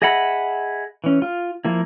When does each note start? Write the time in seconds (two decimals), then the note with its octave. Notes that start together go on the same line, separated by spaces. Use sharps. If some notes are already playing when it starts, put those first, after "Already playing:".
0.02 G#4 D#5 E5 F#5 B5
1.04 E3 C#4
1.22 F4
1.65 F3 A#3 E4